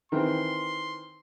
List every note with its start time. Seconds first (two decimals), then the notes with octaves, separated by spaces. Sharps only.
0.12 D#3 E3 C4 C6